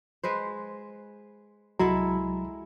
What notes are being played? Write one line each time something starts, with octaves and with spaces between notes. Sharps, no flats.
G#3 B4 C5
C2 F#3 G#3 E4 F#4 A4 A#5